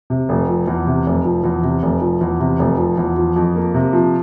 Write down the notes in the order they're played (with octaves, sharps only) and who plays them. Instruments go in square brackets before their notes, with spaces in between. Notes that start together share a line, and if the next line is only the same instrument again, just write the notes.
[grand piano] C3
F1
F3
E2
C3
F1
F3
E2
C3
F1
F3
E2
C3
F1
F3
E2
F3
F2
A#3
C3
F3